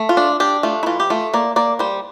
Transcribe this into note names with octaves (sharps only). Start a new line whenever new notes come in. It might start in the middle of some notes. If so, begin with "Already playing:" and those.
Already playing: A3
F4
D4
D4 G4
A3 F4
E4
E3 F4
G4
A3 F4
A#3 D5
A#3 D5
G3 C5